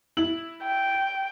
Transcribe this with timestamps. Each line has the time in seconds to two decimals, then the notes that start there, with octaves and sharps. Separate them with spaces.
0.17 E4 F#7
0.64 G5